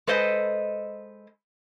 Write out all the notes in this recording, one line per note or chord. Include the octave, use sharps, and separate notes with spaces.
G#3 A4 B4 C5 D#5